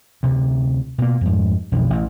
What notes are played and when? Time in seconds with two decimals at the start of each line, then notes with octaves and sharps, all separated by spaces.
0.23 D2 C3
0.98 B2 A#3
1.21 F2 G#2
1.72 B1 F2 B2 D#3
1.90 A1